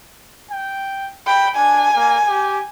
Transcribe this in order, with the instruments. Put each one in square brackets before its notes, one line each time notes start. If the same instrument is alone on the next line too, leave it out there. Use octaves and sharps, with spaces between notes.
[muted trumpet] G5
[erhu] G5 [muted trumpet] B5
[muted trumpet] D4 [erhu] G#5
[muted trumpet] A#3
G4